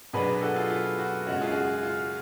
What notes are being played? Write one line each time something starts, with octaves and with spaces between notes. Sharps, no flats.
B2 F#3 B3 D4 G#4 B4
F#4 A4
F4 G#4
F4
F#4
F#2 C#3 G#3 C#4 F#4
F4 G#4
G#4
F#4
F4